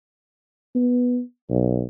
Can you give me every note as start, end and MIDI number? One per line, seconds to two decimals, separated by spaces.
0.75 1.20 59
1.50 1.84 35